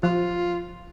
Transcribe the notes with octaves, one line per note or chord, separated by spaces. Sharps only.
F3 F4